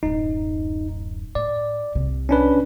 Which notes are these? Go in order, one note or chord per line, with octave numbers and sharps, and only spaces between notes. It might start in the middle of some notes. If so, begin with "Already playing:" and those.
D1 F#2 D#4
A2 D5
C2 C3
C#4 D4 B4